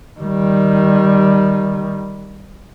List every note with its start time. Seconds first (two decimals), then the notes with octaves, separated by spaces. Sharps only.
0.20 D#3 G3